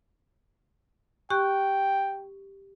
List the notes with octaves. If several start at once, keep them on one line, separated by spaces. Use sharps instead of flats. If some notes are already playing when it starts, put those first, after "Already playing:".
G4 G5 C#6 F#6